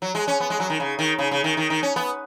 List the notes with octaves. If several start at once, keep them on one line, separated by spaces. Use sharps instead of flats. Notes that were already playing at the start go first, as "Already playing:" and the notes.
F#3
G#3
C#4
B3
G#3
F#3
D#3
C#3
D#3
C#3
C#3
D#3
D#3
D#3
C#4
B3